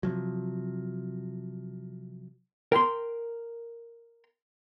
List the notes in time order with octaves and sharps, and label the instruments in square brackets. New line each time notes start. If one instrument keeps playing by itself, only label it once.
[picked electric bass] C3 F3 F#3
[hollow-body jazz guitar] A#4 G5 B5 C6